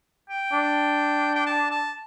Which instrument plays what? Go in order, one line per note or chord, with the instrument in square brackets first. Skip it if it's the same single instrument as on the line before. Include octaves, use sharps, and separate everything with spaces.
[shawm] G5
[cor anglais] D4
[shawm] G5
A5
A5